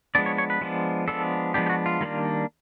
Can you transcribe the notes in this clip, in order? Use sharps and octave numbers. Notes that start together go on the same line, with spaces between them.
F3 G#3 B3 D4 D5
C#5
C#5
B4
F3 G#3 B3 D4
F3 G#3 B3 D4 A4
F3 G#3 B3 D4 G4
G4
F#4
F4
D#3 G3 A#3 D4